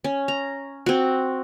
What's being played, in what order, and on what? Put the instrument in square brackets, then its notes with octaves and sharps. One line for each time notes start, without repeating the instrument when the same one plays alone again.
[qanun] C#4
A#5
C4 F#4